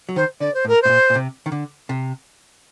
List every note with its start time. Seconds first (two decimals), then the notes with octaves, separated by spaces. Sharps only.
0.09 F#3
0.16 D#3 C5
0.40 D3 D5
0.54 C5
0.65 A2
0.68 A#4
0.82 A2 C5
0.89 A#2
1.10 A#2
1.15 C3
1.46 D#3
1.52 D3
1.89 C3